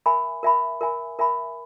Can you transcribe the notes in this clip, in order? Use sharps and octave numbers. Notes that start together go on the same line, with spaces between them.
A#4 E5 G#5 B5
A#4 E5 G#5 B5
A#4 E5 G#5 B5
A#4 E5 G#5 B5